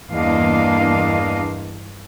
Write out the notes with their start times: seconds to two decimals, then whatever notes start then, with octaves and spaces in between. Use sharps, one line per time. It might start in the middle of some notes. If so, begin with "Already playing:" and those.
0.11 E2 G2 A#3 D4 D#5 F5